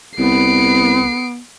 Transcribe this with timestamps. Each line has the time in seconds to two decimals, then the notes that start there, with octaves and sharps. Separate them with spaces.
0.18 C2 B3 C7 D7